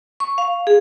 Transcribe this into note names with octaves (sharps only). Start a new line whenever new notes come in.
C#6
F5
G#4